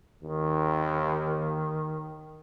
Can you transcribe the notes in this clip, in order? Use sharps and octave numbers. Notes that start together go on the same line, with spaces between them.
D#2 D#3